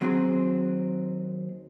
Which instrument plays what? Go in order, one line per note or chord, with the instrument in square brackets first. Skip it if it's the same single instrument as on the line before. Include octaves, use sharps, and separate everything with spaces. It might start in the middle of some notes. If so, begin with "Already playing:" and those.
[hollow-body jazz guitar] D#2 F#3 C4 F#4 G#4 C6